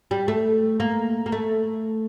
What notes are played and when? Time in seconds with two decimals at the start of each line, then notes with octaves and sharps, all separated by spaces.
0.11 G3
0.28 A3
0.80 A#3
1.26 A#3
1.32 A3